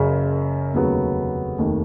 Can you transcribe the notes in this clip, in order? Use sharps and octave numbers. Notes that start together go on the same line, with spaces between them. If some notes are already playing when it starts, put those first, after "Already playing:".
Already playing: F#1 F#2 C#3
F1 D#2 C#3 F#3 B3
F1 D#2 D#3